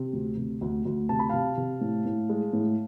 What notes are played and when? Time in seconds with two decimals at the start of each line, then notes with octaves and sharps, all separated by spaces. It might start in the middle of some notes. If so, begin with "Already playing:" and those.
Already playing: C3
0.13 D2
0.37 C3
0.61 D2
0.85 D2
1.09 C3 A5
1.19 B5
1.29 C3 F5 A5
1.57 C3
1.81 A2
2.06 A2
2.29 G#3
2.53 A2